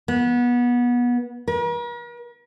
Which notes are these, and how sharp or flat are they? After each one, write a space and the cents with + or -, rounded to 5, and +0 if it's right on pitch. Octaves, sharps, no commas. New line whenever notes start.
B3 -25
A#4 +45